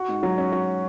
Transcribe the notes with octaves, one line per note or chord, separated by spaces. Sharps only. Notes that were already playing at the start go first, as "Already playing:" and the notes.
Already playing: F#4
G#2
F#3
C#4
F#4